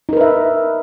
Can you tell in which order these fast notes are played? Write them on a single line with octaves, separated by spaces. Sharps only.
D#4 A#4 B4 E5